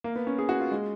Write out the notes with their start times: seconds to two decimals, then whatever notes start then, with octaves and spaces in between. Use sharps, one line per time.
0.04 A#3
0.16 B3
0.27 C#4
0.38 G#4
0.49 F#4
0.60 F4
0.72 G#3